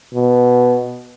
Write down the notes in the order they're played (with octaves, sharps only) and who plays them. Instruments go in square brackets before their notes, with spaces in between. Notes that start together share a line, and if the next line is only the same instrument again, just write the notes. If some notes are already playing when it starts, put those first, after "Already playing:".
[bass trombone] B2